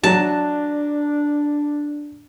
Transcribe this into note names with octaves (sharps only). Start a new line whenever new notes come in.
F#3 D4 A5